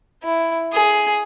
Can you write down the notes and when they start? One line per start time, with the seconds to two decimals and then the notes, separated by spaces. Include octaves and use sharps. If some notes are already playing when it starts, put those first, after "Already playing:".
0.23 E4
0.73 G#4